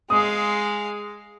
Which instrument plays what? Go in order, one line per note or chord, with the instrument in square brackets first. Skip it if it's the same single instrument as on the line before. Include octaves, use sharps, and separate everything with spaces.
[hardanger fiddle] G#3 F5 [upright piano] D#6